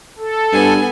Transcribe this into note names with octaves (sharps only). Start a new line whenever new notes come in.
A4
G2 B3 G#5